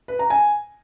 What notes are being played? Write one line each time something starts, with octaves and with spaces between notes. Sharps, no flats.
B4
A#5
G#5